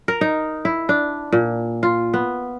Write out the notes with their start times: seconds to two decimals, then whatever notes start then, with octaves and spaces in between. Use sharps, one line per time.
0.08 A#4
0.21 D#4
0.65 E4
0.89 D4
1.32 A#2
1.83 F4
2.14 B3